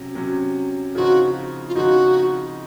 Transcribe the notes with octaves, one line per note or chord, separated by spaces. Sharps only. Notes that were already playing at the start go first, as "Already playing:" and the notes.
Already playing: C3 F#3 C#4
C3 F#3 C#4
C#3 F3 C4 D#4 F#4
F4
C#3 F3 C4 D#4 F#4